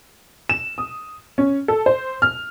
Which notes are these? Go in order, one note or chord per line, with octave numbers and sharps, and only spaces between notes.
E7
D#6
C#4
A4
C5
F6